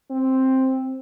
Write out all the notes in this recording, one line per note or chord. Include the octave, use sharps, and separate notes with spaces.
C4